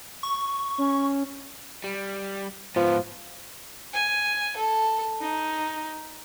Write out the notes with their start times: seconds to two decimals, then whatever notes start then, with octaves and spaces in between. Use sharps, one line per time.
0.23 C#6
0.78 C#4
1.84 G3
2.76 G#2 F3 B3
3.93 G#5
4.56 A4
5.21 D#4